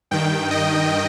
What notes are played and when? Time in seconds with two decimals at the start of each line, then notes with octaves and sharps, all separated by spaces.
0.11 G2 D#3 G5
0.51 D#5